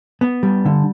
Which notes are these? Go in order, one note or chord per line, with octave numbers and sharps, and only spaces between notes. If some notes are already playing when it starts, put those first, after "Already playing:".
B3
G3
D3